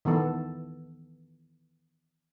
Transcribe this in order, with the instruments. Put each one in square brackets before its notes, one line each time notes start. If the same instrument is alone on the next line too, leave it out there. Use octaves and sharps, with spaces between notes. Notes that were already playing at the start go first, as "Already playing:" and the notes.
[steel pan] D#3 E3 B3 A4